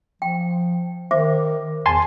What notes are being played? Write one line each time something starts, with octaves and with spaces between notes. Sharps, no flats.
F3 G5
D#3 C5 E5 D6
E2 G#5 A5 C6